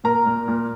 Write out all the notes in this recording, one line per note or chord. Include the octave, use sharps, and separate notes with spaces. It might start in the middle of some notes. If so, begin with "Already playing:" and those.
A#2 A#4 A#5
A#2
A#2